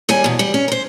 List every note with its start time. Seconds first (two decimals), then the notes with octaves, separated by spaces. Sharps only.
0.09 D#2 G3 G#5
0.24 E2 B2
0.39 G3
0.54 C#4
0.68 A#4 C5